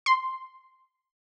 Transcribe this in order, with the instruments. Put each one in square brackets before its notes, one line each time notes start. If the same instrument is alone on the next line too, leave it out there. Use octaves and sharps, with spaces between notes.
[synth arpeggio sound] C6